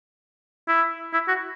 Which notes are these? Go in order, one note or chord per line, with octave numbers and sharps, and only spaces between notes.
E4
E4
F#4